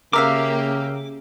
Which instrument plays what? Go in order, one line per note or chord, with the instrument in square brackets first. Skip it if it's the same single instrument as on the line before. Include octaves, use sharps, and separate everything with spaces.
[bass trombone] C#3 [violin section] A#3 G4 [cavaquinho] A#4 E5 F5 [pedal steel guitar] D6